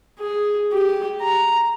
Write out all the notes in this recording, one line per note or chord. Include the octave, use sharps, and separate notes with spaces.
G#4
G4
A#5